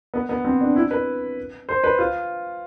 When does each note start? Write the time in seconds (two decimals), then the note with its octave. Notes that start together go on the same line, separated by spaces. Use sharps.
0.14 B3
0.29 B3
0.44 C4
0.61 D4
0.76 E4
0.91 B4
1.69 C5
1.84 B4
1.99 F4